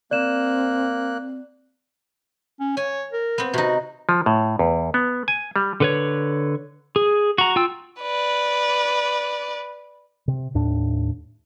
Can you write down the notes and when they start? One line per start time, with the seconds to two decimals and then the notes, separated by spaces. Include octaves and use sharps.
0.11 A#3 C4 D5 F#6 E7
2.60 C#4
2.77 C#5 G#5
3.13 A#4
3.38 B3 C4
3.54 C3 D#4 F#4
4.09 F3
4.26 A2
4.59 E2
4.94 B3
5.28 G#5
5.56 G3
5.80 D3 B4 C#5
6.96 G#4
7.38 F#4 A#5
7.56 F4 G5 E6
8.01 B4 D5
10.28 C3
10.55 D#2 A2 D4